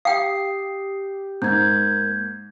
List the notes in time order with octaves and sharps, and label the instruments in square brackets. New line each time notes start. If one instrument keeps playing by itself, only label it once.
[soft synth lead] G4 [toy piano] F5 G5 [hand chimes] D#6 C7
[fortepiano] G#2 [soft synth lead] A#3 [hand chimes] G6 G#6